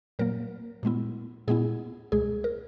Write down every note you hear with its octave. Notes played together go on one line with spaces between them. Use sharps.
A#2 F#3 A#3 A#4
A#2 G#3 B3 E4
A#2 G#3 B3 E4 G#4
C#2 B2 G#3 G#4
A#4